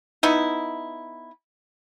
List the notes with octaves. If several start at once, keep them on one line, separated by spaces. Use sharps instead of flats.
B3 D#4 E4